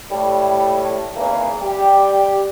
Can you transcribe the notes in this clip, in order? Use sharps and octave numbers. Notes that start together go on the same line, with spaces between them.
A2 G3
G#1 E2 C#3 E3 A#3
G3 G4